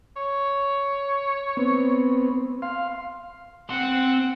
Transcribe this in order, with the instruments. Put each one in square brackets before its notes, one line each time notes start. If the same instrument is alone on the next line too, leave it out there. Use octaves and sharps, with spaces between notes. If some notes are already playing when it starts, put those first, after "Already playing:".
[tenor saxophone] C#5
[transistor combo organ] B3 C4
F5 C6
[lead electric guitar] C4 C6 [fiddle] F#5